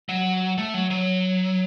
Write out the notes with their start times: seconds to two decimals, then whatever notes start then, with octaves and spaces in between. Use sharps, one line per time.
0.09 F#3
0.58 A3
0.74 F#3
0.90 F#3